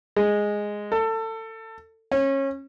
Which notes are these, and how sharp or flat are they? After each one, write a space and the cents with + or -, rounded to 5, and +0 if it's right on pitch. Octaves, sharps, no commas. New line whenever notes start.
G#3 -5
A4 +25
C#4 -25